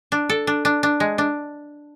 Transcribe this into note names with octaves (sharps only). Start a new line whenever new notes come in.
D4
A4
D4
D4
D4
G#3
D4